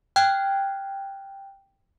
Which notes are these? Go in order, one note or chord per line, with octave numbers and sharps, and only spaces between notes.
G5 F6 F#6 G#6